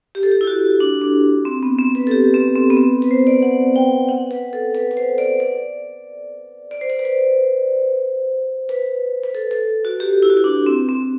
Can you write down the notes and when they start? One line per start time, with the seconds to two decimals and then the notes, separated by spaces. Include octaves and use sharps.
0.15 G4
0.23 A4
0.31 G4
0.41 E4
0.47 F#4
0.80 D4
1.02 D4
1.45 C4
1.63 B3
1.79 C4
1.95 B4
2.07 A4
2.11 G4
2.34 C4
2.56 C4
2.70 B3
2.77 C4
3.02 B4
3.11 C5
3.27 D5
3.42 F#5
3.76 G5
4.09 F#5
4.31 B4
4.53 A4
4.75 B4
4.91 B4
4.97 C5
5.18 D5
5.40 D5
6.71 D5
6.81 C5
6.90 D5
6.99 B4
7.05 C5
8.69 B4
9.23 B4
9.35 A4
9.51 A4
9.85 F#4
10.00 G4
10.22 E4
10.30 F#4
10.37 E4
10.44 D4
10.66 C4
10.89 C4